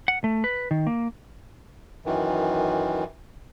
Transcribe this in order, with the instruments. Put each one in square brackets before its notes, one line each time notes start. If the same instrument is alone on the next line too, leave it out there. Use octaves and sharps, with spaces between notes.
[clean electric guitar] F#5
A3
B4
D#3
A#3
[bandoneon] F#2 D#3 E3